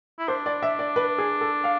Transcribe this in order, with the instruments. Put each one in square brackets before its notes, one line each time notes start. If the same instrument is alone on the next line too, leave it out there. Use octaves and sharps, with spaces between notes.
[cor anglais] E4
[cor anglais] D4 [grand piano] C5
[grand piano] D5
E5
D5
B4
G#4
A4
F5